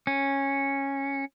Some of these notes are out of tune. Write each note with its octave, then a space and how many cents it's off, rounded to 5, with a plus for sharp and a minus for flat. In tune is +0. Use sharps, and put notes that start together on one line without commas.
C#4 -10